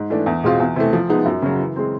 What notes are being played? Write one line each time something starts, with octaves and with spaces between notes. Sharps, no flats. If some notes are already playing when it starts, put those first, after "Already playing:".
Already playing: G#2
E3 A3 D4
E2
B2 G#3 C4 F4
E2
C3 E3 A3
F3
G#3 B3 D#4
F#2
C#3 F#3
E3
G#3 C4